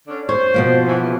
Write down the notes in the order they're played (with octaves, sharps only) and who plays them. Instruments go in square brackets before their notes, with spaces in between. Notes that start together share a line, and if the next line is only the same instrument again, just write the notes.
[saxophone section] D3 C#4 D4
[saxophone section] C5 [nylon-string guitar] C#5
[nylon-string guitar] B2 F3 A#3
[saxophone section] E3 F#4
C#3 E3